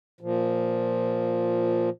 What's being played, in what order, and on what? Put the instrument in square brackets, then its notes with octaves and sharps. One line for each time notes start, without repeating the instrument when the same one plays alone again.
[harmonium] A#2 F3